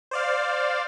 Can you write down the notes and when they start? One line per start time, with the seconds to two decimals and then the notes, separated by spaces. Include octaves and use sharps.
0.11 C5 D5 F5